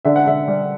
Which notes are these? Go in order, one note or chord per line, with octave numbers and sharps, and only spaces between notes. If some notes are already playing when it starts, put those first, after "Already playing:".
D3 E5
F#5
D3 E5
G3